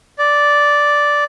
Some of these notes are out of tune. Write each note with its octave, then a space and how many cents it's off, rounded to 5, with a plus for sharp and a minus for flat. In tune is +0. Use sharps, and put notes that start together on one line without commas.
D5 -5